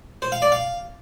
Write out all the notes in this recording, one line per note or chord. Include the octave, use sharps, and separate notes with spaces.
C5
F5
D5
F5